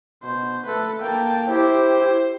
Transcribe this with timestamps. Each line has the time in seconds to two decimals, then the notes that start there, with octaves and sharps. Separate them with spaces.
0.23 B2 C5
0.66 A3 A4 B4
1.01 A#3 G5 A5
1.48 E4 G4 C5